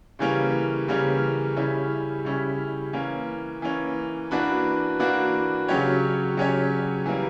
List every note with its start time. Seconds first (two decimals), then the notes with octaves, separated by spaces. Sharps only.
0.19 C#3 E3 G3 A#3 C#4
0.88 C#3 E3 G3 A#3 C#4
1.56 C#3 G3 C#4 E4
2.25 C#3 G3 C#4 E4
2.93 E3 A#3 C#4
3.62 E3 A#3 C#4
4.31 E3 A#3 D4 F#4 B4
4.99 E3 A#3 D4 F#4 B4
5.68 C#3 F#3 C#4 G4 C#5
6.37 C#3 F#3 C#4 G4 C#5
7.06 E3 G3 A#3